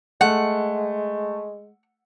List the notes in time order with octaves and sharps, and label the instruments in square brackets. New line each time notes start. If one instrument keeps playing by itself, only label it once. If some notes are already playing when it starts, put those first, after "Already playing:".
[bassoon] G#3 [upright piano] A3 [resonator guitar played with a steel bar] F#5